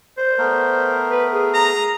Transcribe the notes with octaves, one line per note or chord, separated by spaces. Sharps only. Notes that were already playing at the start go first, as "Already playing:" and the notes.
C5
A3 B3 A#4
B4
G#4
A#5